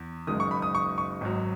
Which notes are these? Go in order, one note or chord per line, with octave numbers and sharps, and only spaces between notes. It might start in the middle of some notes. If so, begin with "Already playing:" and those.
Already playing: E2
F#1 F#2 D#3 G#3 D#6
C#6
B5
D#6
C#6
C#6
G#1 G#2 F#3